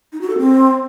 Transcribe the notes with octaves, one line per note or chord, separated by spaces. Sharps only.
D#4
F#4
A4
C4